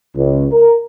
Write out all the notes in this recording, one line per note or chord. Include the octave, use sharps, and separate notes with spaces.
C#2
A#4